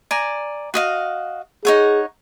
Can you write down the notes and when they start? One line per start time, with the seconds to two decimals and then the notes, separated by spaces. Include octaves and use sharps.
0.11 D5 G#5 A#5
0.74 F#4 D#5 F5
1.65 D#4 G#4 C#5 F#5